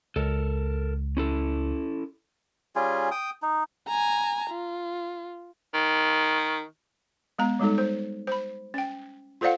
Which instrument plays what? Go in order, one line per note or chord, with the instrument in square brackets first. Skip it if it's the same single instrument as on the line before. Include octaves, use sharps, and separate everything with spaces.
[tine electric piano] C#2 [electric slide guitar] A4 A#4
[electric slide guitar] C#4 E4 A4
[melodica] G3 C#4 F4 G#4
G5 D#6
D#4
[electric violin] G#5 A#5
F4
[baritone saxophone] D#3
[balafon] G#3 B3 A#5
G3 G#3 D#4 A4
C5
C5 B5
C#4 G5
F4 A4 C5 D5 F5 F#5